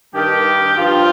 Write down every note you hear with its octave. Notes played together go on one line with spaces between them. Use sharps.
G2 D#3 G4
G2 F3 F4